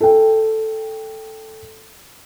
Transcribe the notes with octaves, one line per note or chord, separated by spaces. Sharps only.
A4 G5